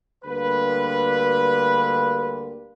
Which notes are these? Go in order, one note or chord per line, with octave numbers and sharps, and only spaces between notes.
D2 D3 G3 A#3 B4